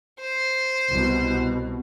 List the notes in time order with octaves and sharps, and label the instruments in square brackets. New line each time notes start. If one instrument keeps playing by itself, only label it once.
[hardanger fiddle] C5
[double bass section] C2 B2